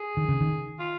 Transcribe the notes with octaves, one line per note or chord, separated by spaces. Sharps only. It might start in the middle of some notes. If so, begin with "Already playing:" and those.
Already playing: G#4
D#3
C#3
D#3
F4